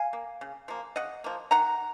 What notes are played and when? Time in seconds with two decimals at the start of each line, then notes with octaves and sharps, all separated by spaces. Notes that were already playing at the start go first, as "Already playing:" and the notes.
Already playing: F5 G#5
0.13 A#3
0.41 C#3
0.68 F3 A#3
0.96 C#3 D#5 F#5
1.24 F3 A#3
1.51 D#3 F#5 A#5